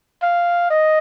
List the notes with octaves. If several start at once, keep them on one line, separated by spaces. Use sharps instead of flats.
F5
D#5